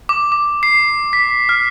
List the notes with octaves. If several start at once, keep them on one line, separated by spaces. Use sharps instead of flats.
D6
D6
C7
B6
F6